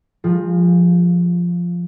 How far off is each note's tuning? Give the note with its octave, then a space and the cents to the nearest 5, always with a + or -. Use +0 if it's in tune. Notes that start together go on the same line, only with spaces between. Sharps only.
F3 +0 G#3 -35 F4 +15